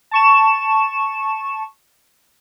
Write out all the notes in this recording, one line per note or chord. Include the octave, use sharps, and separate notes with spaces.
A5 C#6 E7